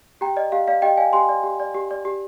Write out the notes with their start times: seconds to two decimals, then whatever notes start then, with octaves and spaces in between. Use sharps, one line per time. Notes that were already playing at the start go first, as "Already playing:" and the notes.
0.21 G4 G5 A#5
0.37 D5 D#5
0.52 G4 F5
0.68 D5 F5
0.82 G4 D#5 G5
0.97 D5 F5 G#5
1.13 G4 G#5 C6
1.29 D5
1.43 G4
1.60 D5
1.74 G4
1.91 D5
2.05 G4